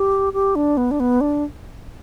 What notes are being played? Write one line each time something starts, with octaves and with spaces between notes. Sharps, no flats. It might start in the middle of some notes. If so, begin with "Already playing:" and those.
Already playing: G4
G4
D4
B3
D4
B3
D4